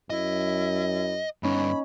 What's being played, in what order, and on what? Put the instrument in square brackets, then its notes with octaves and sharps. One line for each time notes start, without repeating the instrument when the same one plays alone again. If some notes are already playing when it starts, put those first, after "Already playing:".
[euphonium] F#2 [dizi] E4 [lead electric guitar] D#5
[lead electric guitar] G2 B3 [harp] C#4 D#4 [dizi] B5